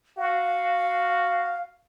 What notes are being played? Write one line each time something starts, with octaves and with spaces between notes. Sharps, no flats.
F#4 F5